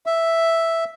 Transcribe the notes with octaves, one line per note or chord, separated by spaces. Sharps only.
E5